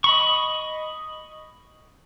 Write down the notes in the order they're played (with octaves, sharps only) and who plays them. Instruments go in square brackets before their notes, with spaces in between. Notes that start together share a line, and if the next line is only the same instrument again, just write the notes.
[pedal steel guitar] D#5 B5 C#6